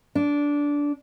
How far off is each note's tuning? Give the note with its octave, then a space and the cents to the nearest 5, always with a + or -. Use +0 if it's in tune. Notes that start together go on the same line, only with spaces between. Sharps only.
D4 -15